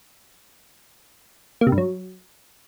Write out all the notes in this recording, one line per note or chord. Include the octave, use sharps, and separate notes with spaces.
A#3
C3
G2
F#3